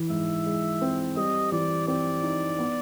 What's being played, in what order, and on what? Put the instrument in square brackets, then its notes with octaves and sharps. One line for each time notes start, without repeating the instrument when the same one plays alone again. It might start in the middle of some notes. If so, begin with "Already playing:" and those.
Already playing: [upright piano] E3
[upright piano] G#2 [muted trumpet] E5
[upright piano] G#3
C4
[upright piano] G3 [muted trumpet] D#5
[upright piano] E3 [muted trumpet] D5
[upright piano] C4 [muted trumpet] D5
[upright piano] D#4
B3